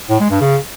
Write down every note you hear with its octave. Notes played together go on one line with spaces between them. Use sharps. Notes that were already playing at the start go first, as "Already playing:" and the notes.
A2
G#3
G2
C#3